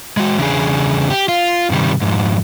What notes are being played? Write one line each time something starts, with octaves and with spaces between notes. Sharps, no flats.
G#3 F#4
E2 C#3 B3 D4 G#4
G4
F4
G2 C3 D#3 G3
F2 G#2